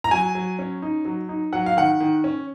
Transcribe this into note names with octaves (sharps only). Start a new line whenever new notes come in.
A#5
F#3 G#5
F#3
C#4
D#4
F#3
D#4
F#3 F#5
F5
D#3 F#5
D#3
C#4